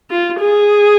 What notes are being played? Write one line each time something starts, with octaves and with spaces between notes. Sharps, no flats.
F4
G#4